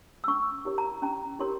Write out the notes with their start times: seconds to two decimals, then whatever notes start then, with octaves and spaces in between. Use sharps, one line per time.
0.24 E6
0.27 C#4 C#6
0.65 E4 G4 A#4 C#5
0.78 A#5
1.02 C#4 A#5
1.39 E4 G4 A#4 C#5 C6